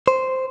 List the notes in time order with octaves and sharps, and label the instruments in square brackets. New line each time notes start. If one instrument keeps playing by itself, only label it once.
[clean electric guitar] C5